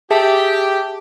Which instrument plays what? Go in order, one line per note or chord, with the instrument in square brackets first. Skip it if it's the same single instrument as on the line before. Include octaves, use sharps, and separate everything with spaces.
[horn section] G4 [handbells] G#4 E5 A5